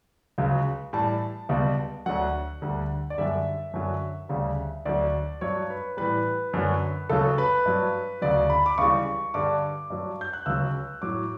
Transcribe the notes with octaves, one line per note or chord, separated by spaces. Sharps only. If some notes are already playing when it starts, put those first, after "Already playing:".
C#2 C#3 F#3
A2 E3 G3 A5
C#2 B2 G3
D2 D3 F#3 F#5
D2 D3 G3
D5
F#2 D3 G3 E5
F#2 D3 F#3
D2 C#3 G3
D2 D3 F#3 D5
G2 F#3 C#5
B4
A2 E3 G3 B4
F#2 D3 F#3
C#2 C#3 F#3 A4
B4
G2 F#3
D2 C#3 F#3 D5
B5
D6
C#2 C#3 E3 G3 C#6
G2 D3 G3 D6
G2 F#3
G6
F#6
C#2 C#3 F#3 E6
A2 F#3 D6